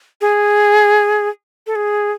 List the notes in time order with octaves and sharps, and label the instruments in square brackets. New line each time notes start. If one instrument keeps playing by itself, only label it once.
[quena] G#4
A4
G#4